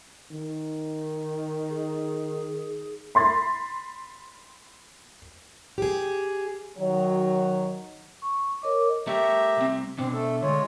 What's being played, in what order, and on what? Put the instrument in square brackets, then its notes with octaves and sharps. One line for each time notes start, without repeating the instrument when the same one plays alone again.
[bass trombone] D#3
[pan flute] G#4
[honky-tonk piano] B5 C6 A6
[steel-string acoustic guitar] G4 G#4
[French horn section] D#3 F#3
[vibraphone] C#6
A#4 C#5 D#5 D6
[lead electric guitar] A3 A#4 [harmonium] G4 E5 A#5
[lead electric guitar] C2 C4
[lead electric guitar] B2 D4 [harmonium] C4
[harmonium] A3 A4
[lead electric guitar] D3 [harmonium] G#3 F4 C#5